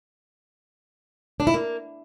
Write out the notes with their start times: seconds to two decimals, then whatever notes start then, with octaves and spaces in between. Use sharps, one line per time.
1.40 D4
1.47 E4
1.54 A#3